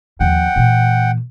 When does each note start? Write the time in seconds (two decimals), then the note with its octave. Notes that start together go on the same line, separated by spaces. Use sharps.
0.20 D#2 F3 F#5 G5
0.56 A#2 E3